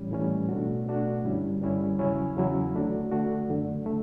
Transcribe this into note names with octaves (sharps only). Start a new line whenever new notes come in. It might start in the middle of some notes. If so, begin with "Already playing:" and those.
Already playing: A2 E3 G3 C#4
A2 E3 G3 C#4
B2 A3 D4 F#4
B2 A3 D4 F#4
G2 D3 G3 C#4 E4
G2 D3 G3 C#4 E4
E2 C#3 F#3 C#4 E4
E2 C#3 F#3 C#4 E4
D3 A3 D4 F#4
D3 A3 D4 F#4
F#2 D3 A3
D3 A3